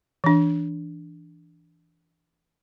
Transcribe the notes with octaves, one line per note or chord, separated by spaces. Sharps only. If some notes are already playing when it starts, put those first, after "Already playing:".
E3 D4